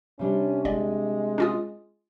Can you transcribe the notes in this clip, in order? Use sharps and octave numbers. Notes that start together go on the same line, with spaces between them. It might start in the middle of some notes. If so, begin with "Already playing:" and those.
C3 G3 C#4 D4
G1 G#3 D5
C#4 F4 D#6